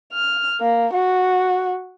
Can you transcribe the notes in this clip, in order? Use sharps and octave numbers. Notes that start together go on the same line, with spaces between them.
F6
A#3
F#4